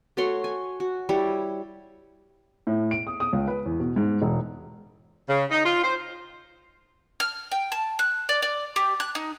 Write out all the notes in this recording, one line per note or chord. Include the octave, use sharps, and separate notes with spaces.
A3 F#4 C#5 C6
G#5
F#4
G3 E4 C#5
A2
D7
D#6
D#6
C#2
B4
E2
B2
G#2
E1
C#3
D#4
F4
C5
F6
G5
A5
F#6
D5
D5
G4
F#6
D#4